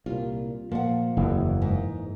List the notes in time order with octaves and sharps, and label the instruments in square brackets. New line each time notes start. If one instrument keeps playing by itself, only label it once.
[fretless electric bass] C2 A#2 [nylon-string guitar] F4
[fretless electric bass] A#2 A#3 [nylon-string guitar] F3 F#5
[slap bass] F#1 E2 [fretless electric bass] E3 A#3
[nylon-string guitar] G#2